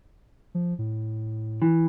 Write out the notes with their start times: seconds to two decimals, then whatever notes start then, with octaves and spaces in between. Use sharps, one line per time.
0.55 F3
0.79 A2
1.62 E3